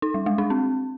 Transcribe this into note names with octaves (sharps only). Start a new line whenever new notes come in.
D#4
G3
G#3
D4
C4